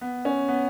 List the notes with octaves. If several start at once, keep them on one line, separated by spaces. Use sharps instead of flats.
B3
C#4
B3